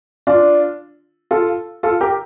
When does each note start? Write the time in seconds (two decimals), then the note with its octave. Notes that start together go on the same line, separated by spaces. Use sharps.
0.27 D4 F4
1.31 F4 A4
1.83 F4 A4
2.01 G4 A#4